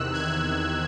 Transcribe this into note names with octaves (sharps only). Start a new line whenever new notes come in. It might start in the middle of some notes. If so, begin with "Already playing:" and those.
Already playing: E2 C3 D#3 E6 F#6
F#6 G#6